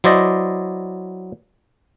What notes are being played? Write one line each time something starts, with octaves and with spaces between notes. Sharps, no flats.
F#3 E4 C5 D5 D#5